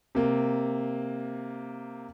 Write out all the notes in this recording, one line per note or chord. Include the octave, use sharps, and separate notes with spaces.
C3 A#3